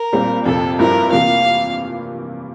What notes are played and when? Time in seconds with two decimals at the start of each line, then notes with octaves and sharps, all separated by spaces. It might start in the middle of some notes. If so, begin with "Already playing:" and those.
Already playing: A#4
0.12 A#2 G3 C4
0.45 F2 C3 F3 A4
0.79 G2 F3 C4 E4 A#4
1.12 C3 E3 A#3 F4 F5